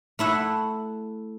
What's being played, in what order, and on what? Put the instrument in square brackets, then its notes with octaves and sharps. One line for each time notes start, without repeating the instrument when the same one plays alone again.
[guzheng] A3 E4 E5 F#5